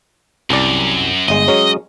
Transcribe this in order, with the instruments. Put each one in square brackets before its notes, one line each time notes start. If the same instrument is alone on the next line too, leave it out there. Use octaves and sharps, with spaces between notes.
[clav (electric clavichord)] C2 D5 [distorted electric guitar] F#2
[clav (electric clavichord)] G1 G#3 [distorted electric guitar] D#5
[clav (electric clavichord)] F#3 G#3 C#4